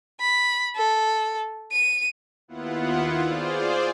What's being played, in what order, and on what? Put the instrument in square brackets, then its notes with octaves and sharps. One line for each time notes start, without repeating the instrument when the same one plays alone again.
[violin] B5
A4
D#7
[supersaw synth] D#2 B3 E4 F4 F#5
F4 G#4 C5 D5